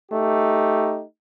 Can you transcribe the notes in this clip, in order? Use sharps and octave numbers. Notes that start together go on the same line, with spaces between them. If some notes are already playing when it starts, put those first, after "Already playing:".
A3 D#4 G4